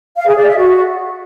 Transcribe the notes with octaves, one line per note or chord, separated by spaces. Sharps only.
F5
G#4
D5
E5
F#4